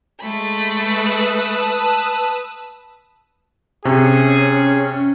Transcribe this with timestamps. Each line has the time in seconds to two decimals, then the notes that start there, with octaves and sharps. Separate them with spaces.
0.20 G#3 A3 B5
0.81 B4 D#6 E6
1.61 A5
3.85 C3 C#4 G#4